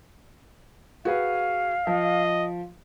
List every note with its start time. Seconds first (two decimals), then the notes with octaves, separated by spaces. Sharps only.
1.05 F#4 G#4 B4 F5
1.87 F3 D#5